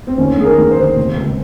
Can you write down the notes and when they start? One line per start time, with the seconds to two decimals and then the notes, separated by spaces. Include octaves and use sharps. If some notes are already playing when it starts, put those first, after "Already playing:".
0.07 C4
0.18 D#2 C#4
0.37 D#3 G#4
0.45 A#4
0.58 D#3
0.71 C5
0.77 D#2
0.96 C3
1.16 C#2